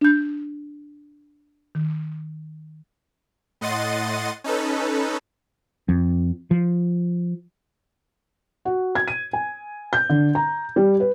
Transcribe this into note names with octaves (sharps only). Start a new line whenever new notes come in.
D4 G6
D#3
A2 D#5 F#5 C6 A6 D#7
C#4 D#4 A4 B4
F2
F3
F#4
G#6
D#7
G#5
G6
D3
A#5
G3
B4